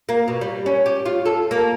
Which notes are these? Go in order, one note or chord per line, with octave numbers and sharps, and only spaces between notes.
A#3
B2
G3
C#4
G4
F4
A4
A#3